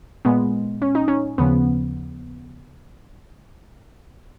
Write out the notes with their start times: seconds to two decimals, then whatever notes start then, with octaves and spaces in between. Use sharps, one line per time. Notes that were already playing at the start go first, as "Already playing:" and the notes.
0.25 A#2 G#3 B3
0.82 C#4
0.95 D#4
1.08 C#4
1.38 D#2 C#3 F3 B3